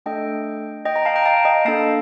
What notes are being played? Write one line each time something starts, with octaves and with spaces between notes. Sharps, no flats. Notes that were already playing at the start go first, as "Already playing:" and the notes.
A3 D4 A4 D#5 G5
D#5 G5
G5 A#5
F5 A5
G5 A#5
F5 A5
D#5 G5
A#3 D4 A4 F5 A5